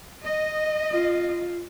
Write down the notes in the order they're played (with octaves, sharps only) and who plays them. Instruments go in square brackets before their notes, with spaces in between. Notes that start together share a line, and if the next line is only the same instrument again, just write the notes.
[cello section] D#5
[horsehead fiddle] F4